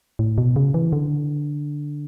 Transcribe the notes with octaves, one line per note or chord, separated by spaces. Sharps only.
A2
B2
C#3
E3
D3